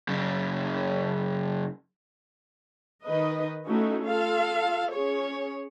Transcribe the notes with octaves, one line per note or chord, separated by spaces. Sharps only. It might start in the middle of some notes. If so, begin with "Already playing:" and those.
F#2 C#3
D#3 D#4 B4 D#5
A3 C#4 D#4 E4 F#4
F4 A4 F5
C#4 G#4 C#5